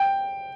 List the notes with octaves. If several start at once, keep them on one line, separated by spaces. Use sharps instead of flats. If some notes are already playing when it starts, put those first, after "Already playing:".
Already playing: G5